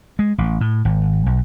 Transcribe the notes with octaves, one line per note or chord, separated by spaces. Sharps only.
G#3
A1
A2
G#1
B1